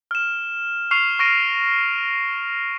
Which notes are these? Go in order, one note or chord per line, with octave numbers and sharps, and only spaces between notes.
F6 E7
C#6 F6 C7 F7
C#6 F6 A#6 D7 D#7